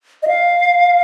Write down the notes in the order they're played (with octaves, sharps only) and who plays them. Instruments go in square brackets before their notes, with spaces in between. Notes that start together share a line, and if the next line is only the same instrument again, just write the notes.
[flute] D#5
F5